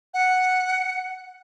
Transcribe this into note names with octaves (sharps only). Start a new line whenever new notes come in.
F#5